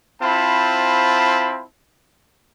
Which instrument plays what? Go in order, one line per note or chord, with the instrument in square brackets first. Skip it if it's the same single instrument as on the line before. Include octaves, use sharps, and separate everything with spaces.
[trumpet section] C4 E4 F4 C5 A5 B5